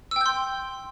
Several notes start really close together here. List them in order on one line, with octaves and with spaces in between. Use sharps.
E6 G5 G6 C6